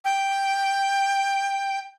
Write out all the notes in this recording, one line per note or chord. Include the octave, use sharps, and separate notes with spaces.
G5